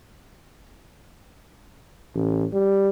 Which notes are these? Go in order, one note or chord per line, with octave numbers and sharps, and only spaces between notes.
A1
G3